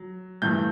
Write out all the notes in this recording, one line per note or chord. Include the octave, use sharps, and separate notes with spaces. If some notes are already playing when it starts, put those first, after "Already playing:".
Already playing: F#3
G2 E3 A3 G6